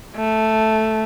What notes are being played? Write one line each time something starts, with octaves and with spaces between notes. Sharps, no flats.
A3